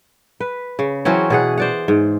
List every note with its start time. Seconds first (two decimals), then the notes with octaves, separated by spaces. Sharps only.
0.40 B4
0.79 C#3
1.05 E3 F#3 C4 C#4
1.30 B2 G#4 F#5
1.57 C5 D5 F#5
1.88 G#2